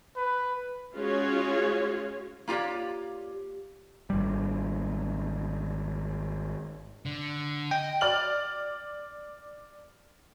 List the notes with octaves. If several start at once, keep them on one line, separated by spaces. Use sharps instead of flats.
B4
G#3 C#4 F4 F#4 G#4 C#5
A#3 F4 G4 C#5 D5
G#1 G3
D3
D#5 G5
D5 F6 F#7